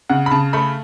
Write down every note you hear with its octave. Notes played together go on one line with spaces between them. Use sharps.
C#3 F#5
B5
C#3 A5
A3 B5